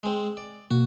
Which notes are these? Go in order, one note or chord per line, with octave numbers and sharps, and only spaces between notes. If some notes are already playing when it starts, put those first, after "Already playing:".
G#3 C4
D5
B2 A#3 F#4